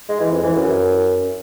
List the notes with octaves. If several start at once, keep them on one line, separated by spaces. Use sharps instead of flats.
G#3
E3
F2
E3
F#2